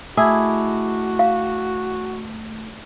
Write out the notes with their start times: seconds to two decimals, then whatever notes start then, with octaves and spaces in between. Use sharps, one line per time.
0.17 A3 E4 F#4 G#4 A5 D6
1.19 F5